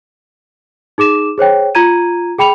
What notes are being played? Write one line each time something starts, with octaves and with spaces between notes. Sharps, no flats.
D#4 G#4 D6 E7
G#4 C5 C#5 G5
F4 A#5 G#6 D#7
G#4 G5 B5 C#7 F7